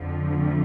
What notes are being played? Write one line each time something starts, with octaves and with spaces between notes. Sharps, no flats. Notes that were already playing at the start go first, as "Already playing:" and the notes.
Already playing: F2 D3 F3
A3